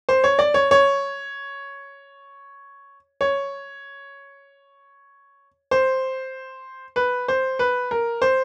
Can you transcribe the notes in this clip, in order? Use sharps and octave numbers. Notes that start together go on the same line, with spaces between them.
C5
C#5
D5
C#5
C#5
C#5
C5
B4
C5
B4
A#4
C5